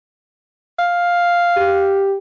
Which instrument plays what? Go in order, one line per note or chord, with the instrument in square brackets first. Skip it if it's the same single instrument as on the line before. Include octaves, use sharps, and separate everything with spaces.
[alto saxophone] F5
[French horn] G4